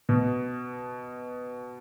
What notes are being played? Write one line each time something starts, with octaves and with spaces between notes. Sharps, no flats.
B2